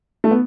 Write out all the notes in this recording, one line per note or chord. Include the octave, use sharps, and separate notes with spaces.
A3
B3